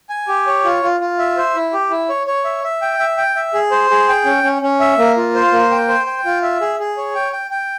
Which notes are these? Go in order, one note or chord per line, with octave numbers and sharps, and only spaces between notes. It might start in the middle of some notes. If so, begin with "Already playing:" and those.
G#5
G4
C#5
F4
F4
F4
E5
C5
E4
G4
E4
C#5
C#5
E5
E5
G5
E5
G5
E5
G#4
C5
G#4
G5
C#4
C#4
C#4
E5
A#3
F4
C5
A#3
G5
C5
G5
F4
E5
G#4
G#4
C#5
G5
G5
G5